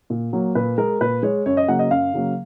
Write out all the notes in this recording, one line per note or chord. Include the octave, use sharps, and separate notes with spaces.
A#2
F#3 A#3
A#2 B4
G#3 A#4
A#2 B4
G#3 C#5
F#2 C#5
D#5
C#3 F#3 A#3 F#5
D#5
F#2 F5
C#3 F#3 A#3